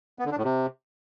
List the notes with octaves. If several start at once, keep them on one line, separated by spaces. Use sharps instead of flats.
B3
D3
D4
A2
C3